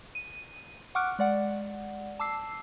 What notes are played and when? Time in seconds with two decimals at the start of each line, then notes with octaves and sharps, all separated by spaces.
0.15 D#7
0.95 F#5 C#6 D6 F6 F#6 D7
1.19 G#3 D5 F#5
2.19 A5 D6 E6 C7